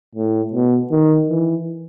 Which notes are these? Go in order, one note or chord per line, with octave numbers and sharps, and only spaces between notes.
A2
B2
D#3
E3